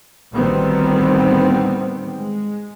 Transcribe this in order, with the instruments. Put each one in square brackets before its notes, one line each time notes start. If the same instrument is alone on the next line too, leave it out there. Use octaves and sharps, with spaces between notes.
[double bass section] A1 D2 D#3 G3 B3 C4
G#3